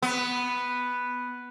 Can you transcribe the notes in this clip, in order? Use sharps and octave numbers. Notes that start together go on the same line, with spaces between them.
B3